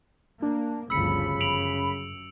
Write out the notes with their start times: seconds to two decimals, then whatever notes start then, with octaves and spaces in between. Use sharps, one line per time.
0.42 A#3 D4
0.90 G1 D2 C#3 F3 B5 E6 C#7
1.41 F#2 D7 F7 F#7